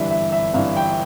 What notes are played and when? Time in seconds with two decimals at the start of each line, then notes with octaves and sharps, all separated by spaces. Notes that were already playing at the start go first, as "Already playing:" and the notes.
Already playing: G1 G2 E3 E5
0.10 E5
0.32 E5
0.54 G1 G2 E3 F5
0.77 G5